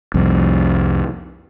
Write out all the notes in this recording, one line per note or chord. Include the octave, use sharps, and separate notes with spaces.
C2 F2